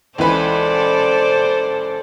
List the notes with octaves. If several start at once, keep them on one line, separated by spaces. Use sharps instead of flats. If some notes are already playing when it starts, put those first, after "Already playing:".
C#2 E3 A4 B4 C5 D5